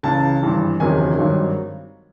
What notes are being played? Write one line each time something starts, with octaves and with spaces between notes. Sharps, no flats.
C#2 C#3 E3 A5
G#1 G2 E3
F#1 E2 C3 D#3 F#3 G#5
G#1 G2 D#3 F#3